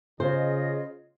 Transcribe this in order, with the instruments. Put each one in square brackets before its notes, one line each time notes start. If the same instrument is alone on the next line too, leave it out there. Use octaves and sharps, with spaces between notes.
[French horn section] C#3 [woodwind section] F4 G#4 D#5 [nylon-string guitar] C5